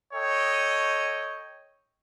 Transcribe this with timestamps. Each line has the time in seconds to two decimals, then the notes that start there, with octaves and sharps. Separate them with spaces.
0.14 A4 C#5 D#5 G5